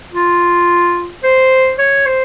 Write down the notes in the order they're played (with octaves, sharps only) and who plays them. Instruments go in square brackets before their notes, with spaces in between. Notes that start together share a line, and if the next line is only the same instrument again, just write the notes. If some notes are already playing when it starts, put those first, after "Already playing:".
[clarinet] F4
C5
C#5
C5